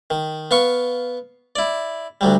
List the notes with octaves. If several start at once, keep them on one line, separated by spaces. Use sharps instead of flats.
D#3
B3 F5 C#6
E4 D5
D2 F#3 G3